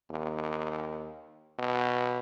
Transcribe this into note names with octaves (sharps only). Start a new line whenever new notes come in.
D#2
B2